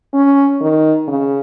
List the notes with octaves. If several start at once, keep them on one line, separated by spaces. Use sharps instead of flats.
C#4
D#3
C#3